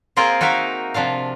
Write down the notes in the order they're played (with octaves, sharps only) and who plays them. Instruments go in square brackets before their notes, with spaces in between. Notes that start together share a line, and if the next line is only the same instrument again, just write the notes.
[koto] A#3 C4 F4 G#4 A#4 C5
D#4 F#4 A#4 E5 F5
C3 F3 D4 F5